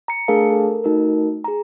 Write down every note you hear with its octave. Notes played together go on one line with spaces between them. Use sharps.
A#5 C#7
A3 D4 G#4 A#4 F5 A5
A4 A#4
A3 D#4 F#4 A#4
G#4 A#5